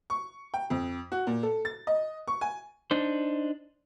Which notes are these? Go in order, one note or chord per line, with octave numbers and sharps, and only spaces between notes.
C#6
G5
F2
F#4
A#2
A4
A6
D#5
C#6
G#5
D4 D#4 C5